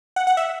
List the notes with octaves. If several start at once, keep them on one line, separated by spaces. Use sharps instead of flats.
F#5
F#5
E5